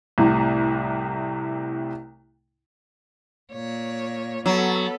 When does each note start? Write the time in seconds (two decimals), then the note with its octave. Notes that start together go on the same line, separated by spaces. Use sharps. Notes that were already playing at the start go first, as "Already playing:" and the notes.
0.18 C2 A2 C3
3.52 A#2 C#5
4.46 F#3 B3 A4